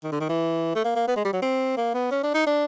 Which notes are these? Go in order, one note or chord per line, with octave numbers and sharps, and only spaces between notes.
D#3
D3
D#3
E3
A3
A#3
A#3
B3
G#3
G3
F#3
C4
A#3
B3
C#4
D4
D#4
D4